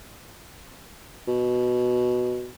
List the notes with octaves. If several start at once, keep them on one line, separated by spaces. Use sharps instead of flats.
B2